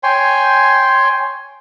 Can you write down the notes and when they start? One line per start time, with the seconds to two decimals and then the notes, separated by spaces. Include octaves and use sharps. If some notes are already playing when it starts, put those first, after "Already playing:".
0.03 C#5 G5 G#5 C6